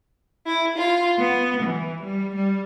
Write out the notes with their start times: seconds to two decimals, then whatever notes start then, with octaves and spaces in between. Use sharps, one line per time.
0.46 E4
0.76 F4
1.18 B3
1.62 E3
2.02 G3
2.35 G3